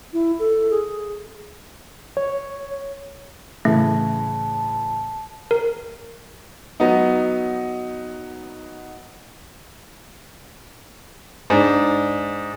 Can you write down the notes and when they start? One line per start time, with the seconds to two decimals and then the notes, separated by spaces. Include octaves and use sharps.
0.13 E4
0.39 A4
0.71 G#4
2.17 C#5
3.65 A2 C#3 E3 A3 A5
5.51 A#4
6.80 F#3 B3 D#4
11.50 G#2 D4